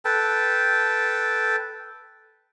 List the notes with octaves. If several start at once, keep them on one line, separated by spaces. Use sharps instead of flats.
A4 B4 G5 A5